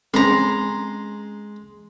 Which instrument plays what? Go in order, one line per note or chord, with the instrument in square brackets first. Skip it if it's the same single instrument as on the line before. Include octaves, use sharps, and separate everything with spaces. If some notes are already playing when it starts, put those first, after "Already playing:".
[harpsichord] G#3 [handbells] C4 C#4 [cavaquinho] A#5 C6